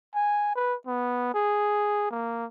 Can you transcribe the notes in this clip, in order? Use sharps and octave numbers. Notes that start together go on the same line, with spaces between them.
G#5
B4
B3
G#4
A#3